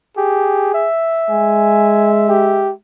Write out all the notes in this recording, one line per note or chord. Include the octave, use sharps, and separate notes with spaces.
G4 G#4
E5
G#3 G#5
G4